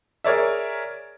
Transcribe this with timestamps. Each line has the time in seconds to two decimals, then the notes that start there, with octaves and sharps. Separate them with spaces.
0.24 G#4 A#4 C#5 D5 E5